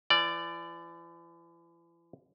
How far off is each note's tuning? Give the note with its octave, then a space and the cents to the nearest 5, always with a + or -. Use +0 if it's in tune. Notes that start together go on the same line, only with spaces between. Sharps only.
E3 +40 D5 +0